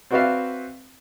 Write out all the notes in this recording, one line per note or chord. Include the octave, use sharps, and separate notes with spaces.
C4 F#4 B4 D5 E5 F5